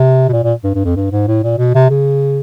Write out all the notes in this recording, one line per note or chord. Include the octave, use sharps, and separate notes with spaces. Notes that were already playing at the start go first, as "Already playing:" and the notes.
Already playing: C3
B2
A#2
A#2
G2
G2
F2
G2
G#2
A2
A#2
B2
C3
C#3